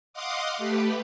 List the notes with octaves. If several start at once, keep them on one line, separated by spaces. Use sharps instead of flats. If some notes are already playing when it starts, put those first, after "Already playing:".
D#5 F5 F#5 C6 D6 D#6
A3 G4 B4